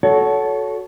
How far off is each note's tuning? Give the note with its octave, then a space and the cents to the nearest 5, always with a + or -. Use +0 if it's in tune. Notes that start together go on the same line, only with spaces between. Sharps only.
F#4 +0 A4 -15 C#5 +25